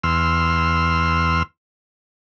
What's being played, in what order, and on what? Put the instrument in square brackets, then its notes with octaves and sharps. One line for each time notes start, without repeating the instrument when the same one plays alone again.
[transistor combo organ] E2 C6 E6 F6